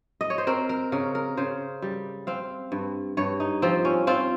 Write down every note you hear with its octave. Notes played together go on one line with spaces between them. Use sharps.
D#5
C#5
C5
C4 A#4
A#4
C#3 A#4
A#4
C#3 C5
G3
C4 F5
G2
G2 C#5
D#4
F3 C4
C#4
C4 F4